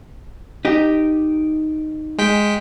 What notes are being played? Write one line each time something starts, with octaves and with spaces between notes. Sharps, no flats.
D#4 G4
G#3 G5 B6